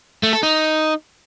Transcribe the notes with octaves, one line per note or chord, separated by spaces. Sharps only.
A3
A4
D#4